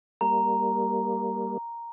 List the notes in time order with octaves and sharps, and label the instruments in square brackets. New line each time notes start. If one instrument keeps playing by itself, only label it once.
[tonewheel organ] G3 A#3 [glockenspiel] A#5